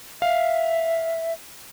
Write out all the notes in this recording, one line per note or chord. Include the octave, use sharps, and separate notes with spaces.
E5 F5